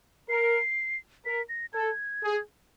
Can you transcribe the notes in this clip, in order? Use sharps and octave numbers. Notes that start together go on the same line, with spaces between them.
A#4 C7
A#4 B6
A#6
A4 G#6
G#4